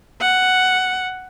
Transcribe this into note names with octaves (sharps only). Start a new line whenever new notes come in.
F#5